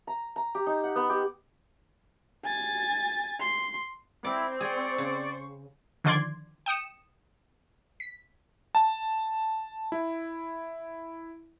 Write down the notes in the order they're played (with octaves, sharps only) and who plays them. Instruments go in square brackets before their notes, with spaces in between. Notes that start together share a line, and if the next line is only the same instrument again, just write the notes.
[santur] A#5
A#5
G4
D#4
F#5
B3
G4
[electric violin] G#5 A6
C6
[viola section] C4 [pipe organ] E4 [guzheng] D5
[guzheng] G#4 [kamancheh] C5 C#6 [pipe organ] D5
[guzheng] C#3
[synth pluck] D3 D#3 F3 D5 C6 G#6
G5 D#6 C#7 E7
B6
[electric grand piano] A5
E4